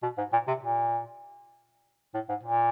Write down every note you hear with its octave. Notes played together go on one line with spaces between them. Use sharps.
B2
G#2
A#2
C3
A#2
A2
G#2
A#2